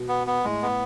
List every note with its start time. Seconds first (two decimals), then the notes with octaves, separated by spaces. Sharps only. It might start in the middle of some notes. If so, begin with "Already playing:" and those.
Already playing: B2
0.09 B3
0.27 B3
0.44 A2 G#3
0.62 B3